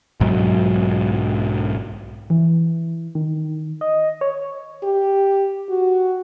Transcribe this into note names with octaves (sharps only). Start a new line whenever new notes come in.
B1 G#2 F#3
E3
D#3
D#5
C#5
G4
F#4